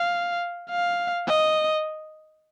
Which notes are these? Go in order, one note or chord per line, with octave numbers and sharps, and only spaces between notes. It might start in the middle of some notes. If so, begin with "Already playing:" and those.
Already playing: F5
F5
D#5